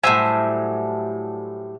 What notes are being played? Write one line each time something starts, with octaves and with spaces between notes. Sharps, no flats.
A2 F#3 G3 C5 E5 G#5